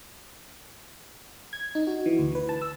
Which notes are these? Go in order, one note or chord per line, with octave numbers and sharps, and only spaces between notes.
G#6
D#4
F#4
E3
D2
B4
A5
E6